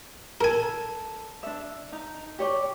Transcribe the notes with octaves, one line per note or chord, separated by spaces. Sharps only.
A4 A#4 G#5
D4 E5
D#4 A#5
G4 C#5 D5